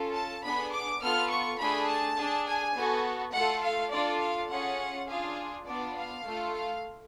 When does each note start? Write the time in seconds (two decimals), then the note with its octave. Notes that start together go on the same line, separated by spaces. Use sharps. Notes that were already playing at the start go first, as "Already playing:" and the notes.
Already playing: C#4 F4 A4
0.14 A5
0.43 B3 D4 G#4 B5
0.72 D6
1.01 B3 F4 A4 F6
1.30 C#6
1.59 A3 D4 G#4 B5
1.88 A5
2.17 D4 G#4
2.46 G#5
2.75 B3 F#4 A4
3.33 A3 F4 A4 F#5
3.63 F5
3.92 D4 F4 A4 D5
4.20 F5
4.50 C#4 F4 G#4 F#5
5.08 D4 F4 G#4 F5
5.66 B3 D4 F4 D5
5.95 F5
6.24 A3 F4 A4
6.53 F5